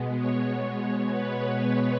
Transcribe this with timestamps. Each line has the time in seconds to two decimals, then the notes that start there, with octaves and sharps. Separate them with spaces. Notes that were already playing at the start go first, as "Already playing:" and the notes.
Already playing: B2 G#3 B3
0.16 C#5
0.47 C#5
1.11 B4